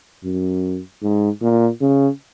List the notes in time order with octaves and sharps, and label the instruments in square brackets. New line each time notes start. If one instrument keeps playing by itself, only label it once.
[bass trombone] F#2
G#2
A#2
C#3